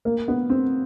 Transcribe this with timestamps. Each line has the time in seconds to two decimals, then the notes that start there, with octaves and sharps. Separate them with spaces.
0.05 A#3
0.28 B3
0.50 C4